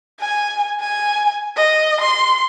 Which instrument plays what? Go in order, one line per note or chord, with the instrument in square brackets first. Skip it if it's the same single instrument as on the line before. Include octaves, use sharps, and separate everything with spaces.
[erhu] G#5
G#5
D#5
C6